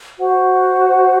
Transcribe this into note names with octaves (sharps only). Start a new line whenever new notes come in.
F#4 C5 F#5